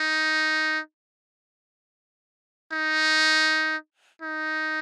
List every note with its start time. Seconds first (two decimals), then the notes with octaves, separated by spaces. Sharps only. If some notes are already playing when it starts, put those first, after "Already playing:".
Already playing: D#4
2.72 D#4
4.22 D#4